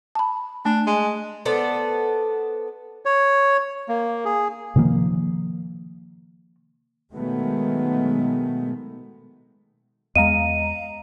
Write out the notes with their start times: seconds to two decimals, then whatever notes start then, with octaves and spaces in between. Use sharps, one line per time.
0.15 A5 B5
0.65 A3 D4
0.87 G#3
1.45 B3 A4 C5 D5
3.05 C#5
3.89 A#3
4.25 G#4
4.76 C3 D#3 F3 A#3
7.13 B2 D#3 F#3 G#3 A3 B3
10.16 E2 G#3 D#5 F5 A#5 D#7